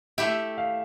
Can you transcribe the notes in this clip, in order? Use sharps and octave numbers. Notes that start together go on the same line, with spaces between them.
A3 E4 G4 E5
F5